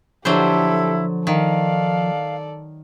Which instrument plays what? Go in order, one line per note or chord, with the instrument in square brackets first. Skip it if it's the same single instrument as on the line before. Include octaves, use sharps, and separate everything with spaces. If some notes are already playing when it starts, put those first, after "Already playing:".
[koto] D3 F#3 C5 [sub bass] F3 [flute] E4 [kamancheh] G4 A4
[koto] D#3 [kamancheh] A4 D5 [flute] F5